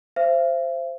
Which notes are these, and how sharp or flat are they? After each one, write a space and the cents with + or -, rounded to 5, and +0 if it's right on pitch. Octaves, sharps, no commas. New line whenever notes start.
C5 +0 E5 +45